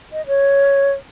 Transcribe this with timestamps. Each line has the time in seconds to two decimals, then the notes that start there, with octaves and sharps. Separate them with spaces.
0.13 D#5
0.27 C#5